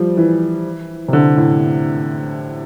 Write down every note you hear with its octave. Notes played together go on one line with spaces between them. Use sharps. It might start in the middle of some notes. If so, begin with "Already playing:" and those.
Already playing: F3 G3
E3
C3
D3
A2